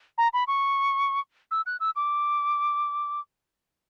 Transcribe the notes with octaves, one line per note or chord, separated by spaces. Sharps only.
A#5
B5
C#6
E6
F#6
E6
D6